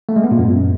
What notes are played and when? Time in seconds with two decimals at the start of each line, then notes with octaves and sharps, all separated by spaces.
0.09 A3
0.16 G#3
0.24 B3
0.31 A#2
0.39 F#2